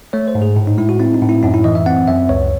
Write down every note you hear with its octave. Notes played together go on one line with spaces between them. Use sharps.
A3 C#5
C5
G#2
G#4
A2
D#4
G#3 E4
F#4
C4 E4
D#4
A2
E4
F#2 D#4
E4
E3 D#5
E5
C4 F#5
F#2 E5
C#2 C#5